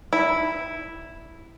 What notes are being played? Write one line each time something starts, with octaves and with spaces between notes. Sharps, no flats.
E4